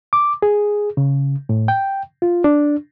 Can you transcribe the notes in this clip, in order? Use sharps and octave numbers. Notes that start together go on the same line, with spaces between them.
D6
G#4
C#3
A2
G5
F4
D4